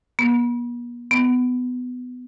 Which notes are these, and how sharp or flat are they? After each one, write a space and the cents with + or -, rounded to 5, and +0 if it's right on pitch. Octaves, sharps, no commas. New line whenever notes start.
B3 -45
B3 +15